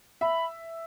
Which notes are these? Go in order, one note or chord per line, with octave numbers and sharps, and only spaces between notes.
E5 B5